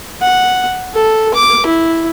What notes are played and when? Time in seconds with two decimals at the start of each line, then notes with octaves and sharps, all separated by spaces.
0.22 F#5
0.94 A4
1.34 D6
1.66 E4